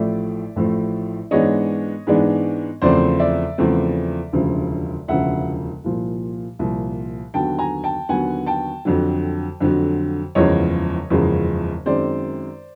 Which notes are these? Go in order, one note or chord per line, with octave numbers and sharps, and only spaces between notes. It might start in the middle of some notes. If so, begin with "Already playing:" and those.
Already playing: A1 A2 F3 A3 D5 E5
A1 A2 F3 A3
G#2 E3 G#3 B3 D4 C#5 D#5
G#2 E3 G#3 B3 D4
E2 C#3 F3 A3 C4 C5 D5
D5 E5
E2 C#3 F3 A3 C4
E1 D2 C#3 F3
E1 D2 C#3 F3 E5 F#5
C2 A#2 F3
C2 A#2 F3
D#2 D3 F#3 B3 G5 A5
G#5 A#5
G5 A5
D#2 D3 F#3 B3 F#5 G#5
G5 A5
F2 D3 F#3
F2 D3 F#3
F#1 E2 C#3 F3 G#3 C#5 D#5
F#1 E2 C#3 F3 G#3
F#2 D#3 G#3 C4 C5 D5